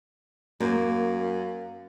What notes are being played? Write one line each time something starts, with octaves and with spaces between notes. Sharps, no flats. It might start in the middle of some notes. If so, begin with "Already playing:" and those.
F#2 A#3